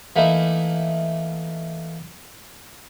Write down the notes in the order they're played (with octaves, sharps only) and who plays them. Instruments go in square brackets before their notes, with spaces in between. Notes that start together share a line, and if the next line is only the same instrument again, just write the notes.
[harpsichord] E3 A3 A#3 D#4 E4